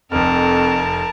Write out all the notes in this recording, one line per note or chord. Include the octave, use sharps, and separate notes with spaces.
F1 F2 A#4 A5 F6